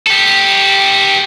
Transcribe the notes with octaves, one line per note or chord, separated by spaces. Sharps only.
G4 A4